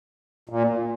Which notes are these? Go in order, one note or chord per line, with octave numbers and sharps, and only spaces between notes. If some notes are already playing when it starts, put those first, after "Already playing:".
A#2